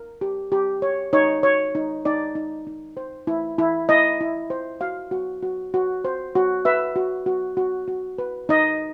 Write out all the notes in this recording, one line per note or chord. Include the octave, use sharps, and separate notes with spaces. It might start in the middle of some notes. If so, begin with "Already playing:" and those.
Already playing: A#4
G4
G4
C#5
D#4 C#5
C#5
D#4
D#4 D5
D#4
D#4
C5
E4
E4
E4 D#5
E4
C5
F#4 F5
F#4
F#4
F#4
C5
F#4
B4 E5
F#4
F#4
F#4
F#4
B4
D#4 D#5